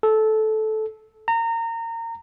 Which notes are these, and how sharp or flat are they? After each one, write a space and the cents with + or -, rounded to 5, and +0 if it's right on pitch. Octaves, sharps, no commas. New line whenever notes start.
A4 -15
A#5 -25